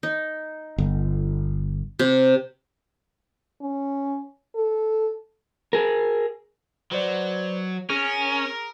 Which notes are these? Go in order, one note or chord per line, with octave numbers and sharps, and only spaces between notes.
D#4
G1
C3
C#4
A4
G#4 A#4
F#3 B4 C5 D5
C#4 G#4 A#4